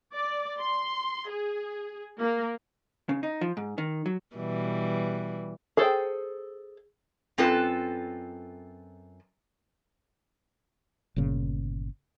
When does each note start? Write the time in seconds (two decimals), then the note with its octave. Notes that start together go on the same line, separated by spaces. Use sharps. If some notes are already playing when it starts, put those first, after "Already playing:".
0.14 D5
0.59 C6
1.29 G#4
2.18 A#3
3.09 C#3
3.23 D#4
3.41 F3
3.57 G#2
3.78 D#3
4.06 F#3
4.36 B2 E3 G3
5.77 G#4 A4 C5 G5
7.38 F#2 C4 F4 A4 B4
11.16 G1 A#2 C#3